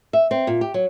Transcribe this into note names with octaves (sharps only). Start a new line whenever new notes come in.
E5
C4
A#2
G4
F#3